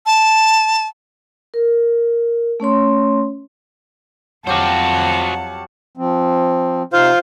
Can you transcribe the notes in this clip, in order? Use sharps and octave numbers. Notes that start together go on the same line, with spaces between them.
A5
A#4
A3 C#4 C#5 C6
F2 F#3 F#4 G4 C5 F5 F#5 A5
F3 C4
C3 D#4 F4 C5 F5